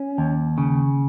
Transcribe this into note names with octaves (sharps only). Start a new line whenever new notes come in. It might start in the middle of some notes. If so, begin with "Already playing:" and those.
Already playing: C#4
D#2
C#3